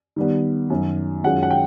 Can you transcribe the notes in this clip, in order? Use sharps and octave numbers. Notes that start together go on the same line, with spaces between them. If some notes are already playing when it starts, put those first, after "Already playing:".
D#3 G3 B3
F#2 D#3 F#3
F#2 D#3 G#3 C#4 F4 F#5
F#5
G5